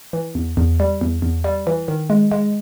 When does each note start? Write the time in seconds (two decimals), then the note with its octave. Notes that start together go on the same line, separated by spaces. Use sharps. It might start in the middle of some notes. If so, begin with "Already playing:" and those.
0.13 E3
0.35 E2
0.57 E2
0.80 G3
1.01 E2
1.22 E2
1.44 G3
1.67 E3
1.88 D#3
2.10 G#3
2.32 G#3